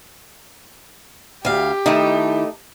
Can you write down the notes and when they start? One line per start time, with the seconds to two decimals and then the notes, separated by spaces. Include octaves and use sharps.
1.45 D2 G4 F5
1.86 D#3 A3 D#4 E4